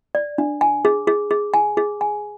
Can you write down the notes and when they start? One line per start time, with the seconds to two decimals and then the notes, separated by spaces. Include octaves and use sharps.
0.15 D5
0.38 D4
0.61 G#5
0.85 G#4
1.07 G#4
1.31 G#4
1.54 G#5
1.77 G#4
2.01 G#5